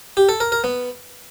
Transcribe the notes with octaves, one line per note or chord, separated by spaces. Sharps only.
G4
A4
A#4
A#4
B3